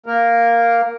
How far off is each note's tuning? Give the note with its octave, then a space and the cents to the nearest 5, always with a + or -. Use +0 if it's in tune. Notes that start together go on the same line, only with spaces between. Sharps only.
A#3 +0 A#4 +0